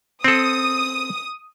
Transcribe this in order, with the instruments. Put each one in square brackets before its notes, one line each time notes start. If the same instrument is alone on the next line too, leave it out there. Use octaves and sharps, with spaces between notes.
[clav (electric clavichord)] C4 A4 [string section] D#6